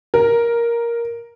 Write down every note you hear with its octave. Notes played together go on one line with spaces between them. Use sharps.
A#4